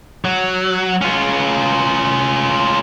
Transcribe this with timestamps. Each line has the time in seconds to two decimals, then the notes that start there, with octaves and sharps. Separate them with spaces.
0.25 F#3
1.01 C#4 F4